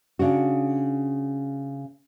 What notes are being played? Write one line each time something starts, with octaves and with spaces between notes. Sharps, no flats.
C#3 D4 F#4